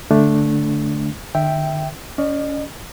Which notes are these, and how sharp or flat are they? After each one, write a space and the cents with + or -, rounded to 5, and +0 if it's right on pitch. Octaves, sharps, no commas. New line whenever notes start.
D3 +0 A3 -5 D4 -5
D#3 -45 E5 +0 G5 +0
C#4 +25 D#5 -40